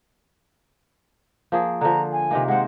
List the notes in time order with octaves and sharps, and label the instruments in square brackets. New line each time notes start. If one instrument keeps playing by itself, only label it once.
[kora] F3 A#3 G#4
[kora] D3 F3 [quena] A#5
[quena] G#5
[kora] C3 D#3 A#3
[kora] G#3 C4 [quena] F#5